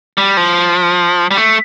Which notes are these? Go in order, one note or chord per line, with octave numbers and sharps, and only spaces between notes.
G3
F3
G3
A3